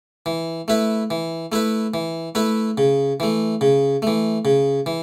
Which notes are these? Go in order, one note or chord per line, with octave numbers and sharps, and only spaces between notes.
E3
A3 E4 B4
E3
A3 E4 B4
E3
A3 E4 B4
C#3
E3 A3
C#3
E3 A3
C#3
E3